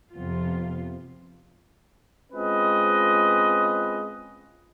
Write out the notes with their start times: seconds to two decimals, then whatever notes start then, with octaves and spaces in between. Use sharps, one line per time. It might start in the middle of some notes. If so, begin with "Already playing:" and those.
0.13 F2 C3 B3 F4
2.33 G#3 C4 C#4 F4 B4 D#5